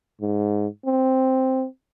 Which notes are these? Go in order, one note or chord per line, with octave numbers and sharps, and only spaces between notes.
G#2
C4